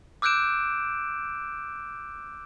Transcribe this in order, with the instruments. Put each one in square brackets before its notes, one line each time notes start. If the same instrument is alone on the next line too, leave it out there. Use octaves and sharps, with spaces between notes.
[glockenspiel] D6 E6 F#6 G6 D7 E7